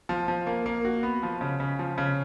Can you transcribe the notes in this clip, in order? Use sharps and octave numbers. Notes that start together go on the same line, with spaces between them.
F3
F3
A#3
A#3
F#4
B3
F3
C#3
C#3
F3
C#3